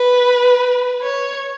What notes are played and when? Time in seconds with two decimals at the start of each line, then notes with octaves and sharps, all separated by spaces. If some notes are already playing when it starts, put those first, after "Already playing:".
Already playing: B4
1.02 C#5